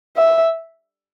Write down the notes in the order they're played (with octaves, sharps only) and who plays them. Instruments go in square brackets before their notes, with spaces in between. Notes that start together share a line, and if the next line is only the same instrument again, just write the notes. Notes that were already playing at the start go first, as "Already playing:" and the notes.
[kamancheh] E5